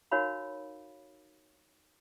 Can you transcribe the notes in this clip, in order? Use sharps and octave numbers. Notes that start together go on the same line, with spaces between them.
D#4 F#4 A#4 C#5 F5 B5